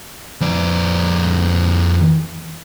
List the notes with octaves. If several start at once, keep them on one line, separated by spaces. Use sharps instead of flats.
F2 D5